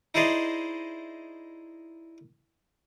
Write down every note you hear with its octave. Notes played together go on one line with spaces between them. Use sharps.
D#4 E4 G#4 C5 D5 D#5